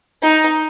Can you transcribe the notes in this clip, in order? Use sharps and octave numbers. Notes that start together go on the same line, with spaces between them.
D#4